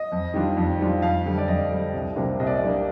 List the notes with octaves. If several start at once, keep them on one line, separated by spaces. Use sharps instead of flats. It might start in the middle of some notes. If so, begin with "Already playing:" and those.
Already playing: D#5
F2
D#3 G3 D4 F4
F2
D#3 G3 D4 F4
F2 F5
D3 G3
D5
F2 D#5
D3 G3
C2
C3 G3 A#3 D4
C2 D#5
D5
D#5
C3 G3 A#3 D4